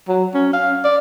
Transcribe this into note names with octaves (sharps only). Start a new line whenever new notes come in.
F#3
C#4
F5
D5